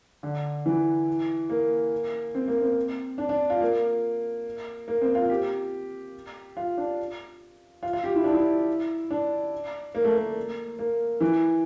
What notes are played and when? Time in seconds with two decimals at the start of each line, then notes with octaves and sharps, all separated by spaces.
0.23 D3
0.66 E3
1.50 A#3
2.35 C4
2.48 A#3
2.61 C4
3.18 D4
3.29 D4
3.50 F4
3.61 A#3
4.88 A#3
5.01 C4
5.15 F4
5.30 G4
6.57 F4
6.78 D4
7.83 F4
7.93 F4
8.04 G4
8.15 E4
8.24 D4
8.32 E4
9.11 D4
9.95 A#3
10.04 A3
10.15 A#3
10.79 A#3
11.21 E3